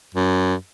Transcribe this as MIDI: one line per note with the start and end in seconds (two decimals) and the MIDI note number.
0.15 0.54 42